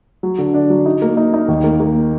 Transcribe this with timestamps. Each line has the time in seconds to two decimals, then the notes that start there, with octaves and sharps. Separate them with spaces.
0.23 F#3
0.38 D3
0.54 D4
0.70 F#3
0.86 D#4
1.02 A#3
1.17 D#4
1.34 D#4
1.48 D#2
1.64 A#3
1.80 A#3